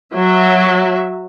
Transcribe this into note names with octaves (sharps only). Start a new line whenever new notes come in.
F#3 E5